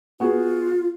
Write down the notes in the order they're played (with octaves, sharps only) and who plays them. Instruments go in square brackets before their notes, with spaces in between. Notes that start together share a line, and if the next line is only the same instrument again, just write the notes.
[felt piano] B3 F#4 G#4 [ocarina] F4